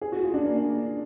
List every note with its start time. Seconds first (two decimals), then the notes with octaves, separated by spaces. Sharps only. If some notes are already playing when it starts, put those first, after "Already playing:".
0.01 G#4
0.12 F#4
0.23 F4
0.34 D4
0.45 A#3